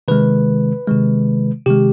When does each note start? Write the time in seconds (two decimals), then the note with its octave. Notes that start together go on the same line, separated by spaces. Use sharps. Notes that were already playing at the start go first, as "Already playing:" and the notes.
0.08 C3 D#3 G#3 B4
0.87 C3 D#3 G#3
1.66 C3 D#3 G#3 G4